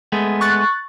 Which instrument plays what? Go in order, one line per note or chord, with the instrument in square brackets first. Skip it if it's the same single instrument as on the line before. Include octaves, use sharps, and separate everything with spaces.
[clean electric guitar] G#3 A3 B3
[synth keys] C#6 F#6 A6